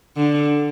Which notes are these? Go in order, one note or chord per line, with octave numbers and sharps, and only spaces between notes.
D3